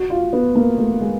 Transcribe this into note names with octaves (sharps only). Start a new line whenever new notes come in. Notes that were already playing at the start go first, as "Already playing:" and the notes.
Already playing: F#4
F4
B3
A#3
A3
G#3